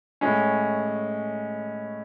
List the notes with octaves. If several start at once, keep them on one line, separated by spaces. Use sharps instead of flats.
A2 G#3 C#4